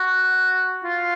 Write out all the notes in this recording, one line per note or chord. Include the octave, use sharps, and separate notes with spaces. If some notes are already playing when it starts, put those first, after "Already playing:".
Already playing: F#4
F4